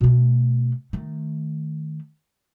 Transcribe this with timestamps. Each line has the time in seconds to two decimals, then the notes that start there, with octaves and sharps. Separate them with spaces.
0.01 B2 A3
0.93 D#3 A3